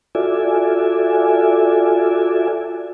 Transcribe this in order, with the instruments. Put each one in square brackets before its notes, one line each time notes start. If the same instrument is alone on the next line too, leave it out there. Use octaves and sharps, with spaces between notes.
[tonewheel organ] F4 F#4 A4 D5 E5 G#5